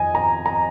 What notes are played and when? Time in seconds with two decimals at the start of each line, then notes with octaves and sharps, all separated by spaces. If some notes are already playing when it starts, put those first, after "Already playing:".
Already playing: F2 D#3 D#5 G#5
0.15 A#5
0.46 A#5